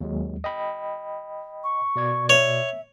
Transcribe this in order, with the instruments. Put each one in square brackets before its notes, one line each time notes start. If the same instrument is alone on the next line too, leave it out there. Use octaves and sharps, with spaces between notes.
[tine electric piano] D#2 F#3 G#3
D#5 G5 B5
[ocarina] C#6
[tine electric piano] B2 D5 G#6
[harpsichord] C#5 [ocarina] E5